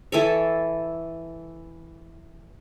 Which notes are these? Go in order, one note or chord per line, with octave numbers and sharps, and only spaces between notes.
E3 A4 C#5